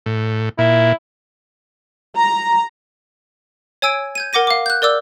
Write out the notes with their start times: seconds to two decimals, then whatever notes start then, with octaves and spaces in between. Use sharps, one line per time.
0.06 A2
0.58 A#2 E4
2.17 A#5
3.82 C#5 G#5 E6 G#6 D7
4.15 G6 G#6 D#7
4.33 A#4 F#5 D6 A#6 D#7
4.47 F5 D6
4.66 F#6 G6
4.82 A#4 D5 D6 E6 G6